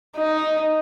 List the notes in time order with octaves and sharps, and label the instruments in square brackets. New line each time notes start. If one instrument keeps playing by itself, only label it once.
[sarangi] D#4